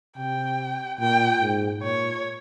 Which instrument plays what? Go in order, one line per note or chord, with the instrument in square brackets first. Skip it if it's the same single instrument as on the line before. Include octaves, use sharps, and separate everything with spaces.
[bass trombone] C3 [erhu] G5
[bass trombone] A#2 [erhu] G5
[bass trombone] G#2
[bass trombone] A#2 [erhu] C#5